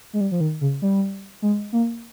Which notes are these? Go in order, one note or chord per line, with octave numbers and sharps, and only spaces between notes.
G#3
G3
F3
D#3
C#3
G3
G#3
A#3